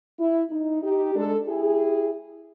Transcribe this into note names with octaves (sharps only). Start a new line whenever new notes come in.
E4
D#4
D#4 G4
G#3 D4 A4
E4 G4 G#4